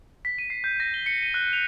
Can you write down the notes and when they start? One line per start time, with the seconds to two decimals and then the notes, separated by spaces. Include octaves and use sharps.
0.25 B6
0.38 D#7
0.50 C7
0.64 G6
0.80 A#6
0.94 G7
1.06 C#7
1.22 D#7
1.34 F#6
1.53 F7